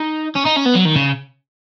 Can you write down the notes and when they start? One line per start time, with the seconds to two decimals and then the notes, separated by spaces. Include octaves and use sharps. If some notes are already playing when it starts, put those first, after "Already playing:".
Already playing: D#4
0.35 C#4
0.45 D#4
0.56 C#4
0.65 B3
0.75 F#3
0.85 D#3
0.96 C#3